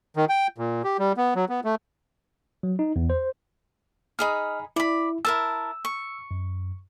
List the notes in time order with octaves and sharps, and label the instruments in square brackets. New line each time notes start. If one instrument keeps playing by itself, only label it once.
[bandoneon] D#3
G5
A#2
G4
G3
B3
F#3
B3
A3
[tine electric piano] F#3
D#4
E2
C5
[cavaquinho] D#4 G#4 B5 [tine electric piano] D#5 F6
[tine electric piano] E4 [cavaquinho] D5 B5
[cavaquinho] E4 A#4 A5 [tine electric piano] E6
[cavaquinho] C#6
[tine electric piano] F#2